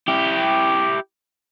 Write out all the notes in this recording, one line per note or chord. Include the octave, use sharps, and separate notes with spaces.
E4 G4